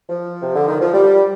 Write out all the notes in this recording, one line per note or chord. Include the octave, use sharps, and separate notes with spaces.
F3
C3
D3
D#3
F3
G3